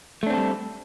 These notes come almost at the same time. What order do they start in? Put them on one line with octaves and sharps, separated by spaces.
A3 D4 C4 A4 G3